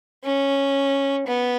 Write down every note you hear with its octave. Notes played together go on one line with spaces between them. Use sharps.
C#4
B3